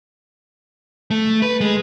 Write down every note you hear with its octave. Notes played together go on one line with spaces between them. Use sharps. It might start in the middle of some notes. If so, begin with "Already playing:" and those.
A3
B4
G#3